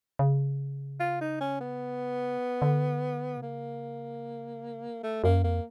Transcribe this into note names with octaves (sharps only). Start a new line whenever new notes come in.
C#3
F4
D#4
C#4
B3
D3
C3
C#3 A#3
A3
F#2 A#3
F2 A#3